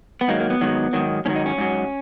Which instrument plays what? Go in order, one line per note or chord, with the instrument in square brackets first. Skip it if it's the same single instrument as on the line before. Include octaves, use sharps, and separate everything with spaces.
[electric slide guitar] B3
G#2 D#3 F#3 A#3
A#3
B3
G#2 D#3 F#3
G#2 D#3 F#3
G#2 D#3 F#3 C#4
D#4
C#4
G#2 F#3